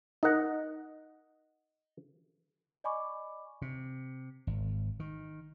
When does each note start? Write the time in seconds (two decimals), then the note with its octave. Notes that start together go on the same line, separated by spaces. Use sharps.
0.23 D#4 A#4 D#5 F#5
2.84 D5 D#5 G#5 B5 C#6 D6
3.62 C3
4.47 G#1
5.00 D#3